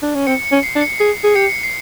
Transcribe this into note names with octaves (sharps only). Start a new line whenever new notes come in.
D4
C#4
C4 C#7
C#7
C#4
C7
D4
C#7
G#4 C7
G#4
G4 C#7
C7